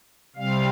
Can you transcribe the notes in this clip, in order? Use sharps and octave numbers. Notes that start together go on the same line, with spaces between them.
C3 G3 C4 F5